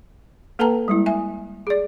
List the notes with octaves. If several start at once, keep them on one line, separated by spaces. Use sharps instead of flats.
A#3 A4 B4 G5 A5 A#5
G3 G#3 E4
E5 G#5
G#4 D5